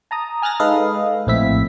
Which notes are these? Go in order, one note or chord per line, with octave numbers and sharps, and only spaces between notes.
A5 A#5 D#6
G#5 F6 F#6 A6 A#6
G#3 D#4 A4 B4 D#5 F5
A#1 A2 C4 E4 E5 B6